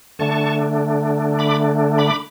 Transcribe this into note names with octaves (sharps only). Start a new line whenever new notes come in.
D3 A3 D4 A5 C#6
B5 D6
B5 D6